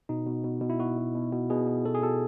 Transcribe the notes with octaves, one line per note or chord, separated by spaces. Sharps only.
B2 D#4
B2
B2
B2
E4
B2 F#4
B2
B2
B2
B2 G#4
B2
B2 A4
G#4
B2 A4